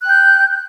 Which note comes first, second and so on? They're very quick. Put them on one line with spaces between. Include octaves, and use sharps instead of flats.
F#6 G5 G6